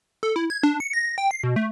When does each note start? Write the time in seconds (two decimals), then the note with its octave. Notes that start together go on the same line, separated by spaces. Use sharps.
0.23 A4
0.36 E4
0.50 G#6
0.63 D4
0.80 C#7
0.93 A#6
1.18 G5
1.31 C7
1.44 B2
1.56 A3